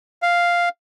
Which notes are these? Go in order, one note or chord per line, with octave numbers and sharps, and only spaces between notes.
F5